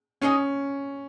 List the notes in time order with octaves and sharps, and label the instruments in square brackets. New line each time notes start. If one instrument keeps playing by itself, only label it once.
[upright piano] C#4 [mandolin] D#4 G#4 D#5 G#5